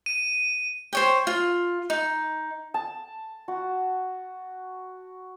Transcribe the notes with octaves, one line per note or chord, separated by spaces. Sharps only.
D#7
C5 C#5 G5
F4
D#4
A5
F#4